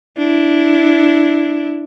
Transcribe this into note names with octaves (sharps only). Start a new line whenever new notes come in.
D4 E4